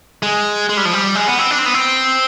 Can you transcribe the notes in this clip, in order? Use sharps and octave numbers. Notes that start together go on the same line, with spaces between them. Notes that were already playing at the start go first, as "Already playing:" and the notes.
G#3
G#3
G3
F3
G3
G#3
B3
C4
D4
C4
B3
C4